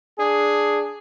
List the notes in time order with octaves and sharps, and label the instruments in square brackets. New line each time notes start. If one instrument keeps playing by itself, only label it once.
[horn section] D4 G#4